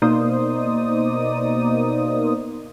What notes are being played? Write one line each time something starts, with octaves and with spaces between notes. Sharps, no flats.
B2 A#3 D#4 C5 D5 D#6